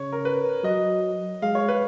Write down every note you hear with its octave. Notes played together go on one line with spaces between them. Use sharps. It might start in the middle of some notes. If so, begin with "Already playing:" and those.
Already playing: C#3 C#5
A#4
B4
F#3 D#5
G#3 F5
C#5
B4